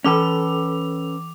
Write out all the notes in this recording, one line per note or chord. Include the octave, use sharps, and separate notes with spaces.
E3 C#4 A4 B4 D6 F7